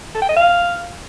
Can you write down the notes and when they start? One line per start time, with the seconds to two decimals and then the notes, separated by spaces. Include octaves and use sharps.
0.14 A4
0.22 G5
0.29 D#5
0.36 F5